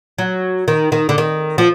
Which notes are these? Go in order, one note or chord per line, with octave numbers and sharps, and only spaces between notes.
F#3
D#3
D#3
D3
D#3
F3